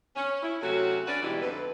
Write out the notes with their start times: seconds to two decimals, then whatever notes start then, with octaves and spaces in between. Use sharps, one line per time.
0.16 C#4
0.42 E4
0.61 C3 F#3 A3 C#4 F#4
1.07 C#4 D4 F#4 B4 D5
1.23 G#2 B2 E3 G3 E4 G4
1.41 F2 D3 D#4 E4 B4